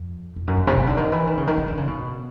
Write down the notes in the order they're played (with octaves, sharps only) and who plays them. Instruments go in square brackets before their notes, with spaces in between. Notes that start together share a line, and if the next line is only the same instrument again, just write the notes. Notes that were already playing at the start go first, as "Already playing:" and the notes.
Already playing: [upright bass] F2
F2
F#2
G2
C3
C#3
D3
D#3
E3
D#3
C#3
D#3
D#3
D3
C#3
B2